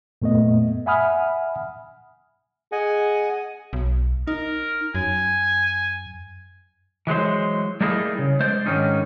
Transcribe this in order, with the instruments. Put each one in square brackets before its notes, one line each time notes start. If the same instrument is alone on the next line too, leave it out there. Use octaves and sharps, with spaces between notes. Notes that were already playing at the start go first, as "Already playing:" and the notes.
[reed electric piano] F#2 A#2 A3 B3 D#5
E5 F#5 G#5 B5 D#6 F6
[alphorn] G#4 [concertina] D#5 F#5 G#5
[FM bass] B1
[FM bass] D#4 [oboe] A#4
[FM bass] F#2 [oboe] G#5
[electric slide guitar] E3 F#3 G#3 C5
G3 A3 A#3 D#4 E4 G#4
C#3
G#3 C5 D5
G#2 D3 D#3 C#4 D#4